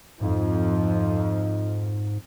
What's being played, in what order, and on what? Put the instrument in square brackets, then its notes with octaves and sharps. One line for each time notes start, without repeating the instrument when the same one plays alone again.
[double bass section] F2 F3 [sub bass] G#2 [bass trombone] D#4